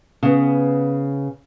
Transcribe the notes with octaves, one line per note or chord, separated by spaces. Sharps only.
C#3 B3